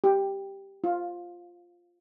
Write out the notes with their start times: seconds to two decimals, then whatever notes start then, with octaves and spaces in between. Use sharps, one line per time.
0.04 G4
0.84 F4